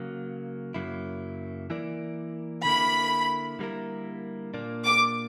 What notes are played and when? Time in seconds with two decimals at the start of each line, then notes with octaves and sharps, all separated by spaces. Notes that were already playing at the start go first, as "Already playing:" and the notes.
Already playing: C#3 F#3 A#3
0.74 F#2 C#3 F#3 A#3 E4
1.70 E3 A#3 E4 A#4 D5
2.65 D3 A#3 E4 B5
3.59 D3 G3 A#3 E4 A#4
4.54 A#2 A#3 D4
4.86 D6